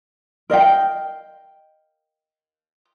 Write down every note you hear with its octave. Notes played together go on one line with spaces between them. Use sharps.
A#4 D#5 F5 G5